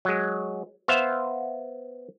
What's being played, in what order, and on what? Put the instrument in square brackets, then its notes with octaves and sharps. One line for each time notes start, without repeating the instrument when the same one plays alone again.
[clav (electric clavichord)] F#3 G#3
B3 C5 E5 F5